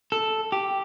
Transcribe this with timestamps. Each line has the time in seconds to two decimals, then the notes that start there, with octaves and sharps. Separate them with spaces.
0.12 A4
0.52 G4